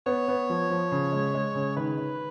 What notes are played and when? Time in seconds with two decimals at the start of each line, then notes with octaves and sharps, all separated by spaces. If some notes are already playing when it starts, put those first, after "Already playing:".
0.06 B3 C#5
0.28 B3
0.50 F3
0.70 F3
0.91 C#3
1.12 G#3
1.34 G#3
1.55 C#3
1.77 D#3 B4
1.98 D#3